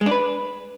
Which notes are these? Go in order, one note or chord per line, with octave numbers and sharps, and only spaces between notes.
G#3
D4
B4